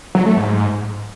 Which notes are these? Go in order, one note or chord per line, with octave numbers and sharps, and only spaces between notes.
F#3
A3
G#2